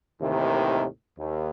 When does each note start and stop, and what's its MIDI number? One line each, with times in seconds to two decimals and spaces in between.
0.22 0.86 39
0.22 0.86 45
0.22 0.86 48
0.22 0.86 51
0.22 0.86 52
1.18 1.50 39